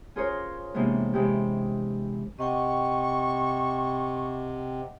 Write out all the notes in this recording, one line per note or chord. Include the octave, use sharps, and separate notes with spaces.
C#4 F4 G#4 A#4 C5 C#5
C3 E3 G#3 A#3 B3 D4
C3 E3 G#3 E4 G4
C3 D#5 F#5 G5 C#6